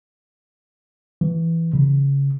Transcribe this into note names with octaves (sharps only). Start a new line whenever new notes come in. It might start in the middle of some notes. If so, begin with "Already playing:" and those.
E3
C#3